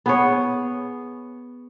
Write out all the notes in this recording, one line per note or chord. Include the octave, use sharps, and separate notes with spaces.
B3 G#4 C#5